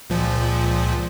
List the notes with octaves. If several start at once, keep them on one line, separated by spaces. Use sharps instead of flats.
C#2 A#2 F3